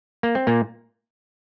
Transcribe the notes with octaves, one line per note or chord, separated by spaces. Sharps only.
A#3
C4
A#2 A#3